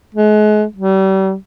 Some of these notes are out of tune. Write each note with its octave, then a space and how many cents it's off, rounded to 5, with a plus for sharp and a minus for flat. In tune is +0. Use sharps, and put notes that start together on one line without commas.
G#3 +35
G3 -35